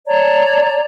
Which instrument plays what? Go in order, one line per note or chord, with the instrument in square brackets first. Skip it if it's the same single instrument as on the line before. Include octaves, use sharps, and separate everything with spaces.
[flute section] C#5 D5 A5 A#5